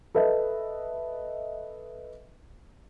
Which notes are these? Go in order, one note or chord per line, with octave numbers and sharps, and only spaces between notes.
A4 B4 D#5 E5